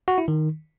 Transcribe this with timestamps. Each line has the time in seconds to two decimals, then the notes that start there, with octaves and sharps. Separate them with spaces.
0.08 F#4
0.18 E4
0.28 D#3